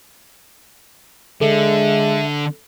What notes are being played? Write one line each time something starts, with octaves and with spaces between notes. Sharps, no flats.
D3 G#3 A4 E5